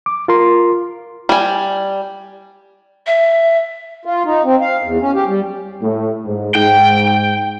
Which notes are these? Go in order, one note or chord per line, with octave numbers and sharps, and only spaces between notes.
D6
F4 A#4 C6
G3 G#5
E5
F4
D#4
C4
F5
E2
C#4
G4
G3
A2
G#2
G#2 G5